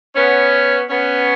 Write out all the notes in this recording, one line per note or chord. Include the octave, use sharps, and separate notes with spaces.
B3 C#4
B3 C#4